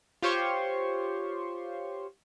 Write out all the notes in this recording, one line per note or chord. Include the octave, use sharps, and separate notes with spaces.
F4 G4 C5 C#5 C6 C#6